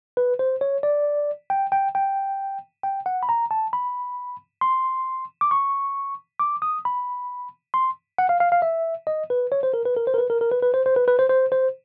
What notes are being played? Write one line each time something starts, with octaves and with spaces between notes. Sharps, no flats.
B4
C5
C#5
D5
G5
G5
G5
G5
F#5
B5
A#5
A5
B5
C6
D6
C#6
D6
D#6
B5
C6
F#5
F5
F5
F5
E5
D#5
B4
C#5
C5
A#4
B4
A#4
C5
A#4
B4
A#4
A#4
B4
B4
C5
C5
B4
B4
C5
C5
C5